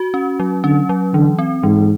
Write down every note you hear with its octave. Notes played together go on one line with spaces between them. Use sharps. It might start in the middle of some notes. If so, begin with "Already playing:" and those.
Already playing: F#4
C#4
F#3
D3 C#4
F#3
D3 E3
C4
G#2 E3